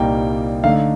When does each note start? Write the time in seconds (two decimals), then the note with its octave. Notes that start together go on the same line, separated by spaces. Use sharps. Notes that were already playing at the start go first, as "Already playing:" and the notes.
Already playing: C2 A#2 G3 A#3 D#4 G5
0.64 D3 A3 D#4 F5